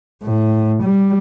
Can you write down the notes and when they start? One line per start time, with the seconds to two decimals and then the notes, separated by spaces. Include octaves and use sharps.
0.23 A2
0.83 G3